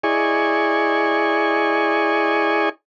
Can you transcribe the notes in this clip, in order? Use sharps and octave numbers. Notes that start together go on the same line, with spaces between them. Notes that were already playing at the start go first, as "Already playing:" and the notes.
E4 G#4 D5 D#5 G#5 C#6